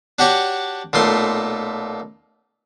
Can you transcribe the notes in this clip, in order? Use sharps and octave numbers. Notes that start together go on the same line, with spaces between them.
D4 F#4 G4 C#5 D6
B1 A#2 A3 C6